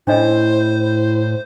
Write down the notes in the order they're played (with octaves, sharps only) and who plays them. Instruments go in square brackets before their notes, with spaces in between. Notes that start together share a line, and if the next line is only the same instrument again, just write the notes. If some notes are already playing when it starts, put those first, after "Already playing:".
[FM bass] A2 [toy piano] C#4 D4 D#5 [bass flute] E4 [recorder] C5